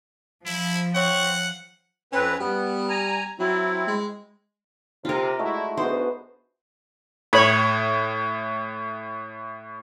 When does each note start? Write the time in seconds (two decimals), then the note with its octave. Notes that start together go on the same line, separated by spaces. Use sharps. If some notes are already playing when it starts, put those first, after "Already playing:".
0.46 F3 E4
0.95 C4 C#5 F#5
2.13 F2 C4 C#4 B4
2.40 G3 B3
2.89 G#5 A#5
3.40 F#3 C4 E4
3.87 G#3
5.05 C3 F4 A#4
5.39 G#3 A3 E4 F#4
5.77 D2 G#2 B3 F#4 G#4 C5
7.33 A2 C#5 B5